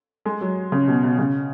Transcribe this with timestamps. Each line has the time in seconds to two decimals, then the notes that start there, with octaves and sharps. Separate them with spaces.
0.26 G#3
0.41 F#3
0.72 C#3
0.88 B2
1.03 B2
1.19 C#3